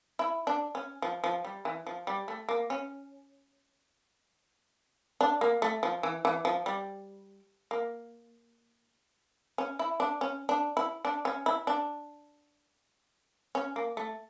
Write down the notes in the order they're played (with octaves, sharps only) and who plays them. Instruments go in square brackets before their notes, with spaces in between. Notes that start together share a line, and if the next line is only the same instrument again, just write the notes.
[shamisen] E4
D4
C#4
F3
F3
G3
E3
F3
G3
A3
A#3
C#4
D4
A#3
A3
F3
E3
E3
F3
G3
A#3
C#4
E4
D4
C#4
D4
E4
D4
C#4
E4
D4
C#4
A#3
A3